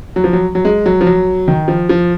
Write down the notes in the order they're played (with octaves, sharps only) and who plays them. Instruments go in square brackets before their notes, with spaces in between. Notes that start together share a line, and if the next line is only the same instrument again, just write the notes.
[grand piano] F#3
F3
F#3
F#3
G#3
F#3
F3
F#3
D#3
F3
F3